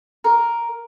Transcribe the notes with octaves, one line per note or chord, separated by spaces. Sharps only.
A#4